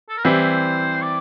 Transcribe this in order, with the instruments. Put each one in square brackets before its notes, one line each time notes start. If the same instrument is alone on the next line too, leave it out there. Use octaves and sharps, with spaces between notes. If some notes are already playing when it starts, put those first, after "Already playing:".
[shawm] A4
A#4
[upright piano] E3 G3 C4 E4 G4 [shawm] C5
[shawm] D5